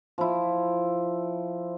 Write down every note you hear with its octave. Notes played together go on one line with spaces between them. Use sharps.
F3 E4